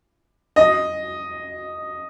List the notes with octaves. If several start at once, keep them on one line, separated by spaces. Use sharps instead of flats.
D#5